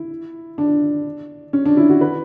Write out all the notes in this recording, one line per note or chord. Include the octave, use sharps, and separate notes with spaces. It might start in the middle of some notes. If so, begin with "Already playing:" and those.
Already playing: E4
D4
C#4
D4
E4
F#4
B4